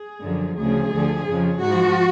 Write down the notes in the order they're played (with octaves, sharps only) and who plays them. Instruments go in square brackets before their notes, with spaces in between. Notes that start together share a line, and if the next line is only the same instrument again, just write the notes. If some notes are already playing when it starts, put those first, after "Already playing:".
Already playing: [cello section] G#4
F#2 D3 F3
D2 C#3 F3 G#4
D2 D3 F3
F2 C#3 F3
G#2 F3 F#4